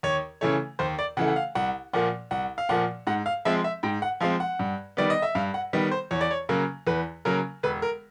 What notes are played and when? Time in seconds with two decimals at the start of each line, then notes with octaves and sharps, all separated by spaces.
0.03 D#2 C#5
0.41 C#3 E3 A3 C#5
0.79 D#2 C5
0.99 D5
1.17 C#3 E3 A3 F#5
1.27 F#5
1.36 F5
1.55 C2 F#5
1.93 A#2 F3 A#3 F#5
2.31 C2 F#5
2.58 F5
2.69 A#2 F3 A#3 F#5
3.07 G#2 F#5
3.26 F5
3.45 F3 G#3 C4 E5
3.64 E5
3.83 G#2 G5
4.02 F#5
4.21 F3 G#3 C4 F5
4.40 F#5
4.59 G2
4.97 D#3 G3 B3 D5
5.10 D#5
5.22 E5
5.35 G2 F5
5.54 F#5
5.73 D#3 G3 B3
5.92 C5
6.11 E2 C#5
6.21 D5
6.31 C#5
6.49 C#3 F#3 A#3
6.87 E2 B4
7.25 C#3 F#3 A#3 A#4
7.63 E1 B4
7.82 A#4